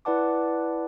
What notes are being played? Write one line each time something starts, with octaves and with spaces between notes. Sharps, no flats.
E4 B4 D5 F#5 A5 D6